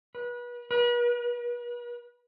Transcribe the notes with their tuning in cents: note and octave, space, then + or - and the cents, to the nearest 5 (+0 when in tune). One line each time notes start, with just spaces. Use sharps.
B4 -30
B4 -40